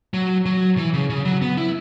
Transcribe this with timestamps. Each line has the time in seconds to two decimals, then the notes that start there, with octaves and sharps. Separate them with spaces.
0.14 F#3
0.46 F#3
0.77 E3
0.93 C#3
1.10 C#3
1.25 F#3
1.42 B3
1.58 E4